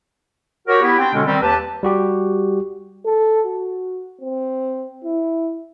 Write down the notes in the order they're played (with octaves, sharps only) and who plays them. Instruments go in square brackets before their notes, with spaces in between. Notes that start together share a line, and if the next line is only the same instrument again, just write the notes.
[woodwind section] F#4 G4 A#4 C#5
B3 E4 G4
C4 D4 G5
B2 D3 G#3 C#4
D#3 G3 C4
D#2 G4 B4 A5
[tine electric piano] G3 F#4 G4
[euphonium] A4
F#4
C4
E4